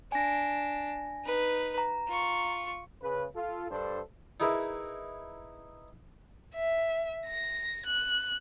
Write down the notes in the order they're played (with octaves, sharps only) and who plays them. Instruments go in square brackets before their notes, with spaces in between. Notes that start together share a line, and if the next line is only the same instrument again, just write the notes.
[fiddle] D4 [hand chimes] G#5 A#6
[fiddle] D#4 B4
[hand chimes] A#5
[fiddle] F4 C#6
[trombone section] C#3 B4
F4 A4
G2 D4 A4 C5
[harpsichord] D#4 E4 G#4 A#4 B4 E5
[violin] E5
A#6
F#6